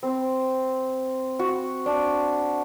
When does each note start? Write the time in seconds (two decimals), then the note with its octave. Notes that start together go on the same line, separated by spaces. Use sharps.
0.03 C4
1.39 F#4
1.86 D4